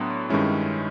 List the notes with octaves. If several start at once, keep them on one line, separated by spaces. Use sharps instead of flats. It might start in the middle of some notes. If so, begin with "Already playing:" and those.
Already playing: A2 F#3 B3 D4 B5 C6
G2 D#3 G#3 C#4 E4